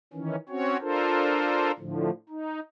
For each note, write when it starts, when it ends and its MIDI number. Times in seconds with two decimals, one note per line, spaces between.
0.13 0.36 51
0.13 0.36 52
0.13 0.36 61
0.49 0.77 60
0.49 0.77 61
0.49 0.77 66
0.49 0.77 73
0.81 1.71 62
0.81 1.71 65
0.81 1.71 69
0.81 1.71 70
0.81 1.71 72
1.78 2.10 45
1.78 2.10 50
1.78 2.10 53
2.29 2.60 63